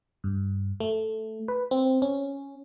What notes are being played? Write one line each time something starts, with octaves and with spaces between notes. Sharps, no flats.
G2
A3
B4
C4
C#4